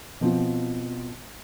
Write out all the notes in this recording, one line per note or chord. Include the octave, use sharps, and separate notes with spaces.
B2 F3 C4